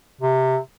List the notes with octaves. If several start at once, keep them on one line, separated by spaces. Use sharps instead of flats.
C3